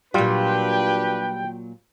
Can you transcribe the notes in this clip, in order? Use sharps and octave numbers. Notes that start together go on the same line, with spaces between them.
A#2 F#3 G3 D4 F4 G4 B4 G5